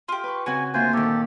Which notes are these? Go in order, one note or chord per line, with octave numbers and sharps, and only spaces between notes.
F4 G4
B4 C#6
C#3 C4 F#4 F#5 G#5
D2 A#3 F4 C5 G#5
A#2 D#3 G4 A4